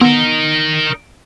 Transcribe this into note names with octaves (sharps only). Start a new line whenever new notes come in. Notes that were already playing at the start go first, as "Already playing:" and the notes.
B3 D#4 A#4